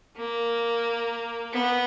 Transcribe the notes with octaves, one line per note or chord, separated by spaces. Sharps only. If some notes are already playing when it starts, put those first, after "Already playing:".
A#3
B3